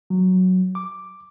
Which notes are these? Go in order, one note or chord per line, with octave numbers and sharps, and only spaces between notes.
F#3
D6